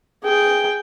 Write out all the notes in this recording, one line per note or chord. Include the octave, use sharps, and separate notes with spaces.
G#4 G5